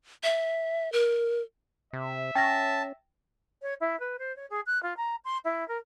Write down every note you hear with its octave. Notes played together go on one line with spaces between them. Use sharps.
E5
A#4
C3 E5
C#4 G5 A5 A#6
C#5
E4
B4
C5
C#5
G#4
F#6
F4
A#5
C6
E4
A#4